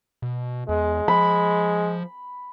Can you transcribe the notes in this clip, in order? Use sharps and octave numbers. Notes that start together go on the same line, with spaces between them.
B2
E2 G#3
F3 B5